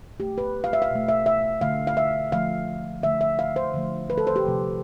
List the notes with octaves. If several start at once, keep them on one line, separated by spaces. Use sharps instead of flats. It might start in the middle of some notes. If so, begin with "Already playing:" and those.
B2 A3 G4
B4
F5
E5
F5
B2 A3
E5
E5
D3 A3 F5
F5
E5
D3 F3 A3 F5
D3 A3 E5
E5
F5
C5
D3 F3 A3
B4
A4
C5
G4
C3 F3 A3